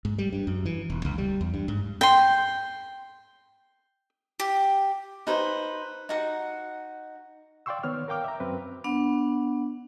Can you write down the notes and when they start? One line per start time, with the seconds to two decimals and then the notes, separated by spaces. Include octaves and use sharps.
0.05 G#2
0.18 G3
0.32 G2
0.47 F#2
0.66 E3
0.90 E1
1.05 C#2
1.18 G3
1.41 E2
1.54 G2
1.68 G#2
2.01 G5 C6
4.40 G4
5.27 D#4 B4 C5 B5
6.09 D#4 F#4 F#5
7.66 D5 F5 G5 C6 C#6 E6
7.83 D#3 B3 C#5 F6
8.08 A#4 F5 G5 D6 F6
8.24 E5 A#5
8.40 F#2 C4 B4
8.84 B3 D4 F#5